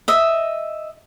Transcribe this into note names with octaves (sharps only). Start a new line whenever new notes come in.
D#5 E5